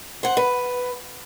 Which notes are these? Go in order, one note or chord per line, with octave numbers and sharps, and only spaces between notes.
C5 F#5
B4